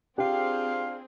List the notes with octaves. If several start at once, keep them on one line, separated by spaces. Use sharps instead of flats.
C4 D4 F4 G4 G#4 F5